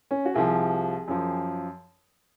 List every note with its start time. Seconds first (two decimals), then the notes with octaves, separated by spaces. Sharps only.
0.11 C#4
0.25 F#4
0.34 C2 C3 F3 G#4
1.08 F#2 F3